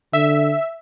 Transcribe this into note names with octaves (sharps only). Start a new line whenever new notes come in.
D3 E5